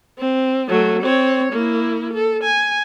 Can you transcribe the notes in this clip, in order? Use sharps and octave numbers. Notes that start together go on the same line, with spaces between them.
C4
F#3 A3
C4 C#5
A#3 E4
A4
G#5